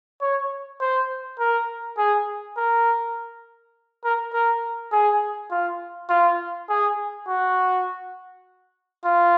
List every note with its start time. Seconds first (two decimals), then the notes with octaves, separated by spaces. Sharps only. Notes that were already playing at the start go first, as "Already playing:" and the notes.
0.21 C#5
0.81 C5
1.39 A#4
1.98 G#4
2.57 A#4
4.04 A#4
4.33 A#4
4.92 G#4
5.51 F4
6.09 F4
6.69 G#4
7.28 F#4
9.04 F4